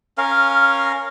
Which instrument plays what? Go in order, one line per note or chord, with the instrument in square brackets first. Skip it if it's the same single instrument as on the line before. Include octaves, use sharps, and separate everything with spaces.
[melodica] C#4 A#4 F5